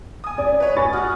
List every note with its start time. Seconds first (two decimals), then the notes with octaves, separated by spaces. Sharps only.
0.24 G#5 D#6
0.38 D5
0.60 B4 C#5
0.77 G#5 C#6 A6
0.93 F#4 D#6 F6